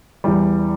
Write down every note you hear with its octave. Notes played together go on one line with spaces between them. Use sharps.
E2 E3 G3